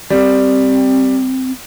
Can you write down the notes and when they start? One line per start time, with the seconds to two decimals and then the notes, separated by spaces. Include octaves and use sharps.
0.10 G3 C4